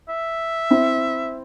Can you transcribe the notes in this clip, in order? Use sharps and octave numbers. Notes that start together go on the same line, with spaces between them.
E5
C4 E4